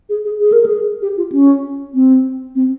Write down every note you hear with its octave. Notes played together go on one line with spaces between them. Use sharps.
G#4
G#4
G#4
A#4
G#4
G4
F4
C#4
C4
C4